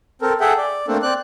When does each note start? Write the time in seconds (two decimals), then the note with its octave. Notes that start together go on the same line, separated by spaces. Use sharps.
0.22 C4 A4 A#4
0.41 G#4 A4 E5 F#5 G5
0.58 D5
0.88 A3 A#3 C4 D4 A4
1.02 C4 D5 F#6